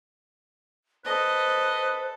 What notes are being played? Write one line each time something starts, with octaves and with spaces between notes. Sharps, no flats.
A4 B4 C5 D#5